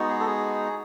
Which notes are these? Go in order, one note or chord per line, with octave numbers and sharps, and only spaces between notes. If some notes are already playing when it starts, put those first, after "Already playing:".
Already playing: G#3 B3 D#4 F#4
G#4
A4
G#4